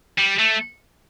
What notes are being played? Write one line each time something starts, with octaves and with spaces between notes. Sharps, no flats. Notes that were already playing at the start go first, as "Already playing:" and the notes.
G3
A3